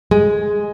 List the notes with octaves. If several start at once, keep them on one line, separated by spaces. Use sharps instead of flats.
G#3